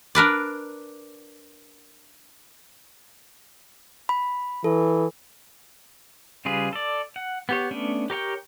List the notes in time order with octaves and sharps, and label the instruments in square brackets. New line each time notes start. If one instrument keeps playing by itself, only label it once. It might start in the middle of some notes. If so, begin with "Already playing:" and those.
[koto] D4 A#4 B4 D5
[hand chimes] B5
[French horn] E3 [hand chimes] A4
[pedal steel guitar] C#3 G3 F4 G#4 B4
A4 D5
F#5
B3 G4 C#5
A3 B3 C#4 D4
G4 A#4 C#5 G5